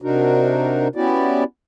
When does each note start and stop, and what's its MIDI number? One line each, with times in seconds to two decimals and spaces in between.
0.02 0.88 48
0.02 0.88 62
0.02 0.88 63
0.02 0.88 66
0.02 0.88 70
0.96 1.44 59
0.96 1.44 61
0.96 1.44 64
0.96 1.44 66
0.96 1.44 67
0.96 1.44 74